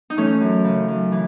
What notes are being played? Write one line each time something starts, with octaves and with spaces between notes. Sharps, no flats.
D#4
E3 A3 C#4
F#2
C#3
F#2
E3